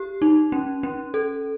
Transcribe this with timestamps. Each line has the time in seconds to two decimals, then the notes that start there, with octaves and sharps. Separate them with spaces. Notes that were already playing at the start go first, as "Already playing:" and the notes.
Already playing: G4
0.22 D#4
0.52 C#4
0.83 C#4
1.14 A4